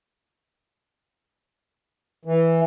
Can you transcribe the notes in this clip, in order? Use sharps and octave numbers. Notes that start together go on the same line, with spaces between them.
E3